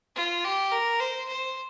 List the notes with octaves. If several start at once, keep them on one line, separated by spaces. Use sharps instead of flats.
F4
G4
A#4
C5
C5